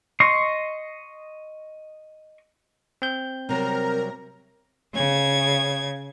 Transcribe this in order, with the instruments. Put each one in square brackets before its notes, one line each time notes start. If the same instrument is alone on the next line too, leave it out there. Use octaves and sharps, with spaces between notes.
[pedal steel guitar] D#5 C6 C#6
[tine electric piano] C4 G6
[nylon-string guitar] C3 F#3 G3 [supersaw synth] A#4 A#5
[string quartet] C#3 G#6